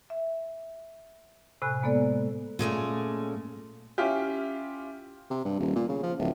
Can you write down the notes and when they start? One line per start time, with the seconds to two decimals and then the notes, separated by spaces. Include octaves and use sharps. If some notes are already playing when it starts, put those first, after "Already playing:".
0.10 E5
1.62 A2 C3 G#5 B5 F#6
1.83 G#3 A#3 B3 A4 D5
2.59 A#2 G#3 A3 C#4
3.98 C#4 E4 F4 G4
5.30 C3
5.45 G2
5.59 D#1
5.75 A#2
5.89 C#3
6.03 F3
6.19 D1